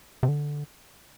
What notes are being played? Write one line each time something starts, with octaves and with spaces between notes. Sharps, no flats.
C3
D3